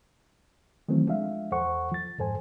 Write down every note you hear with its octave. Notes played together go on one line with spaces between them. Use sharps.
D#3 E3 F#3 A3 C4
F3 G#3 D4 E5 F5
E2 A4 C5 F#5 C#6
F3 A6
F2 G#2 A4 C5 G#5